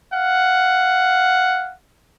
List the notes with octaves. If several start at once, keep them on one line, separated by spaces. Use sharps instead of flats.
F5 F#5